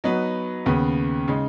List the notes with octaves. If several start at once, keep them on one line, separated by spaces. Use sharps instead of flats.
F#3 B3 D#4 B4
D#2 C#3 B3
C#3 G#3 D#4